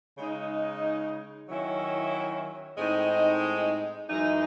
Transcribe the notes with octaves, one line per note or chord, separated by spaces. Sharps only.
C#3 G#3 D#4
D#3 F#3 C#4 E4
A2 G#3 C4 D#4
F#2 E3 G#3 D#4